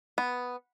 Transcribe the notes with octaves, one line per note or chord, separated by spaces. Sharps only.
B3